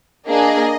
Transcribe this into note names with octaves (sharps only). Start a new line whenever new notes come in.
A#3 D4 G#4 D#5